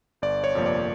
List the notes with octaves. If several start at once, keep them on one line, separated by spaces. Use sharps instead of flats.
G1 D5
C#5
F2 C3 F3 A#3
D5